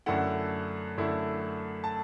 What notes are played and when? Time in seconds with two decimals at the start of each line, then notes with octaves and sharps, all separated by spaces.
0.06 F#2 D3 A3 E4 F#5
0.98 F#2 D3 A3 E4
1.84 A5